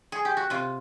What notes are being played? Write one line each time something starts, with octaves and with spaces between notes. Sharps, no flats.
G#4
G4
F#4
C3 F4